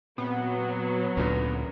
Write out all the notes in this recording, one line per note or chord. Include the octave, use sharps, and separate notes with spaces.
A#2 F#3 B3 C4
D2 A#2 A3 C#4 A#4